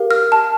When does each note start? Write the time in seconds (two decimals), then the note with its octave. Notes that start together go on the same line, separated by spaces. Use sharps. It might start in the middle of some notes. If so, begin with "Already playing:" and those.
Already playing: G4 A#4 F5
0.11 F6
0.32 A5